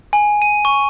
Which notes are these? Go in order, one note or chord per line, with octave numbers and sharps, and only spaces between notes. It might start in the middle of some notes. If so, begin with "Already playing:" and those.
G#5
D#7
C#6